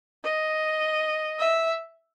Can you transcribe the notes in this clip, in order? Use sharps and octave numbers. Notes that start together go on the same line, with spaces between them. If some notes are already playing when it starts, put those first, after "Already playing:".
D#5
E5